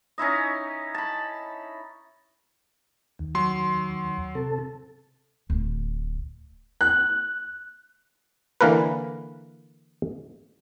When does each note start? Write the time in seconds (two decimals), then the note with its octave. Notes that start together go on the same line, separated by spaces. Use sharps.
0.18 C#4 D#4 E4 D#5
0.94 A5 B5
3.19 D#2
3.35 F#3 C6
4.35 C3 A4
5.50 D1
6.81 F#6
8.61 D3 E3 A#3 A#4 B4